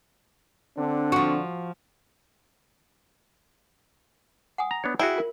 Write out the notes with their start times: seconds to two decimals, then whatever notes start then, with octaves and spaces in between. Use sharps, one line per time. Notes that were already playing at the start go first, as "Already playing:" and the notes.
0.77 D3 C4 D4
1.12 F3 F#4
4.58 F#5 G#5 D#6
4.71 A#5
4.84 B3 D4 C#5
4.99 E4 F#4 G#4 G5
5.16 F4 A#4